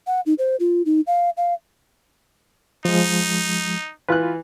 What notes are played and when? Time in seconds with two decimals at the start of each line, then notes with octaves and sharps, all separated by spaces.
0.07 F#5
0.26 D#4
0.38 C5
0.60 F4
0.86 D#4
1.07 F5
1.37 F5
2.85 F3 G#3 D#4
4.09 E3 F4 B4 F#6